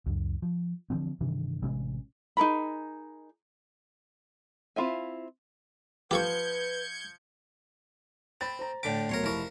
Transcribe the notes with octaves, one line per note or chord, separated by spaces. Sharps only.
C#2 F#2
F3
D3 E3 F3 C4
G2 C3 D#3 E3
A1 C3 G#3 C#4
D#4 G#4 A#4 B5
C4 E4 F4 E5 G#5
F3 G4 A4 B4 C#6 G6 G#6 C#7
C4 B5 A6
C5 A#5
A2 D3 G5 D6 B6
D2 B2 F#3 A#4 C#5 C6
F1 F3 E4 A#4 C#6